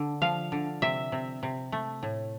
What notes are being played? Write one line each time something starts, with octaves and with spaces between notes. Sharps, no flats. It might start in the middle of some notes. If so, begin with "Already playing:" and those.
Already playing: D3
F3 F5
D3
C3 E5
C3
C3
A3
A2